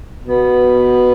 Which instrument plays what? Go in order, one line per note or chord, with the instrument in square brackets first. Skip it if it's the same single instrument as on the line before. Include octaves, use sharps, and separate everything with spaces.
[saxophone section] B2 B3